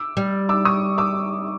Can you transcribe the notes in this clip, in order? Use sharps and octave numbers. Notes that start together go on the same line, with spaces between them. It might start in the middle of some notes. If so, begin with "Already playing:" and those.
Already playing: D6 E6
G3
D6 E6
C#6 D#6
D6 E6